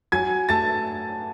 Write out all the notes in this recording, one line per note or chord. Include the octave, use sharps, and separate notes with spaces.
F#3 G#5 G#6
A3 A5 A6